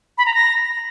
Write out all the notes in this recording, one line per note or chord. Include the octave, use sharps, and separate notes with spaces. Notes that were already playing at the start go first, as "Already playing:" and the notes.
B5
A#5
A#6